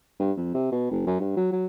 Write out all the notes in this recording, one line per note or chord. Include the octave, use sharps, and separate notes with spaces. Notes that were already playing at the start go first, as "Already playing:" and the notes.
G2
F2
C3
B2
F#1
F#2
G2
F#3
F#3